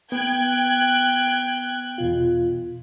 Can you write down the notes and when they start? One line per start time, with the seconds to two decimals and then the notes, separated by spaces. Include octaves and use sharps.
0.12 B3 G5 F#6 G#6
1.98 E2 B2 F4